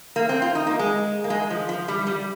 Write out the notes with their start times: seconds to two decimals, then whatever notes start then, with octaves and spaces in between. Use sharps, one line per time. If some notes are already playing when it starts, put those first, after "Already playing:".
0.16 A#3
0.29 C4
0.42 F4
0.55 D#4
0.67 A#3
0.79 G#3
1.24 A#3
1.30 G#3
1.50 F3
1.69 F3
1.88 G3
2.07 G3